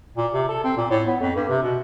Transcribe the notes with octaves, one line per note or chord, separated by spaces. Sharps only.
A#2
C3
A4
C4
A#2
A2
B3
F2
G2
C3
B2